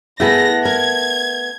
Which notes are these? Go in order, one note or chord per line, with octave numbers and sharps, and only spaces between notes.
A3 B3 E4 G#4 A#4 A#6
A#4 G#6